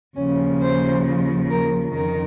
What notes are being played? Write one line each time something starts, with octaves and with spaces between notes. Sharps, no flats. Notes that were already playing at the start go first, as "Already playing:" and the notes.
D#2 C#3 F3 C#4
C5
A#4
F2 D#3 A#4